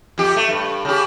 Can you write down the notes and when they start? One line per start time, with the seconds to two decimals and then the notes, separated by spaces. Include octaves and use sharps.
0.18 F2 G4
0.36 A3
0.49 G2
0.85 C#3 G4